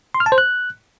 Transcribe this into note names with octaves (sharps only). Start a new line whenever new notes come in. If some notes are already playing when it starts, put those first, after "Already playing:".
C6
F6
A5
C5
F#6